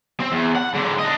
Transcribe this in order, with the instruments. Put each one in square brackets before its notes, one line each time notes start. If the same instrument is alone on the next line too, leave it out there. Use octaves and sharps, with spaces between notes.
[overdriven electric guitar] C4
E2
F#5
G#2 D3
D4 D#5